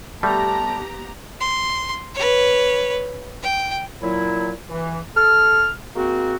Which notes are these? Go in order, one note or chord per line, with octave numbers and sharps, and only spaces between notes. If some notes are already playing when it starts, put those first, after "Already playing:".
G3 A3 B3 G4 A5 A#5
C6
B4 C#5
G5
A#2 F#3 E4
E3
A4 F6
G#3 A#3 C4 F#4